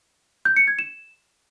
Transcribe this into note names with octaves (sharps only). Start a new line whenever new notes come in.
G6
C#7
G#6
E7